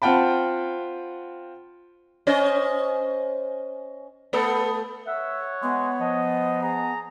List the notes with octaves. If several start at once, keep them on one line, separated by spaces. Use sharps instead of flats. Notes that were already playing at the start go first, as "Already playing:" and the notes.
C4 F4 F#5 G5 A5 B5
C#4 C5 D#5
A3 B3 A4
C#5 E5 F#5
G#3 B3
F3 D#5
G#4 A#5